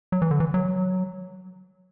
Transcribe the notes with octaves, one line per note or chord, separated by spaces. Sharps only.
F#3
E3
D3
E3
F#3